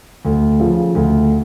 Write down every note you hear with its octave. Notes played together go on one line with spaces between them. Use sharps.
D2
C#3 F3
D2